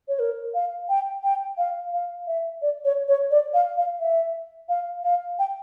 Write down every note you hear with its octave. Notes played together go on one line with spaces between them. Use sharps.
C#5
A#4
F5
G5
G5
F5
F5
E5
D5
C#5
C#5
D5
F5
F5
E5
F5
F5
G5